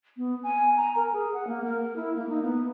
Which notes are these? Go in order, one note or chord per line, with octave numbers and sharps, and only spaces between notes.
B3
G#5
A#5
A#4
G#4
F#5
A#3
A#4
E4
A#3
D#4
B3